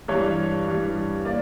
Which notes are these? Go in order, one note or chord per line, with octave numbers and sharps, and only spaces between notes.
G2 E3 G3 C#5
G2 E3 G3
A#3 D5